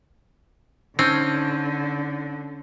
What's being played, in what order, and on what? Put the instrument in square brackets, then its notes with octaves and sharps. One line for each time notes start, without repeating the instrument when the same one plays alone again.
[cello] D3 [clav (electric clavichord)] C4 [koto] C#4 [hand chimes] D#4 G6 G#6